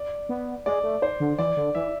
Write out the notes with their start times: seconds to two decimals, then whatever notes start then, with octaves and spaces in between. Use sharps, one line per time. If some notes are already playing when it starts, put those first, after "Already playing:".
Already playing: D5
0.29 B3
0.66 G#3 D5
0.83 A3
1.02 C5
1.20 D3
1.39 E3 D5
1.57 D3
1.75 E3 E5